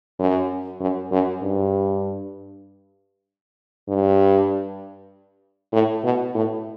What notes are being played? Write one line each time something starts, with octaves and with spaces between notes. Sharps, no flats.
F#2
F#2
F#2
G2
G2
A2
B2
A2